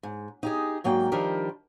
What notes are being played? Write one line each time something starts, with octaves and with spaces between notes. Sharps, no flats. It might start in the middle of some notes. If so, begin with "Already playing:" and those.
G#2
D#4 G4 G#4
G#2 F#3 A#3 D5 G5
D#3 F3 G3 D4 G4 A#4